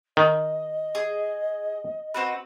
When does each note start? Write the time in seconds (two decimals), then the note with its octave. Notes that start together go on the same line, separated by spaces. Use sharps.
0.17 D#3 D#5
0.95 G#4
2.14 C4 F#4 B4